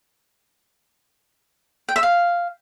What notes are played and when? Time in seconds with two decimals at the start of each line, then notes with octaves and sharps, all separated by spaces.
1.89 G5
1.96 E5
2.03 F5